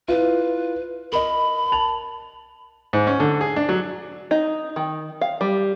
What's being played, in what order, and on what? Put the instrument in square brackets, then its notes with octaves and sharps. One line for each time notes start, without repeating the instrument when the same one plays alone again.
[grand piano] E4 F4 [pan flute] B4
[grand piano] A#4 D#5 [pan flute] B5
[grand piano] A5 F7 F#7
[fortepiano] G#2
C#4
D3
G#4
D4
F#3
[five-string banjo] D#4
D#3
F5
G3